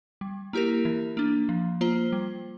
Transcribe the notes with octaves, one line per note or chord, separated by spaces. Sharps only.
G3
A#3 E4 G4 A#4
E3
A#3 D4
F3
A#3 F4 C5
G3